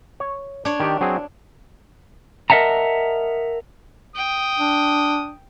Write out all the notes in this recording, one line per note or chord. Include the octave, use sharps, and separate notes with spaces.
C#5
D4 C#5
D#3 G4 D5
F#3 C4 G#4
A#4 D#5 E5 F#5 A5 A#5
G5 D#6
D4